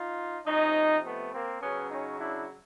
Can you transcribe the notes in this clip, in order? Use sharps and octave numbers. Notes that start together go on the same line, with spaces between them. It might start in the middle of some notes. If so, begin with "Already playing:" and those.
Already playing: D#4 F4
C3 F3 C#4 D#4
A3 B3
A#3 C4
C#3 F#3 B3 C#4
C#4 D#4
D4 E4